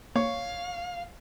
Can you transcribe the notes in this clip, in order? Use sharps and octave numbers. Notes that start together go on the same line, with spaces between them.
A#3 C#5 F5